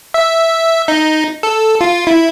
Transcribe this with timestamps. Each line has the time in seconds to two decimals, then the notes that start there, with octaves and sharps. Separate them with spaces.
0.14 E5
0.88 D#4
1.43 A4
1.81 F4
2.07 E4